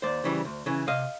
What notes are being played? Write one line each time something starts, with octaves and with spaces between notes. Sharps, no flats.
D#2 C5 D5
C#3 E3 G3
D2
C#3 E3
C3 D#5 F5